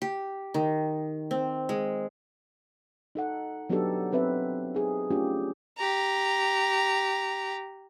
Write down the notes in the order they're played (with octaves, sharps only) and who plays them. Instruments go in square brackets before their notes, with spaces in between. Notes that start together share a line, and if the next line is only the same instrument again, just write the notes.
[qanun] G4
D#3
C4
G#3
[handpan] D#4 A4 F#5
F#3 B3 D4 D#4 G4 A4
B3 C4 B4 E5
D#4 G#4
A3 C#4 D4 F4 G4
[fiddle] G4 A#5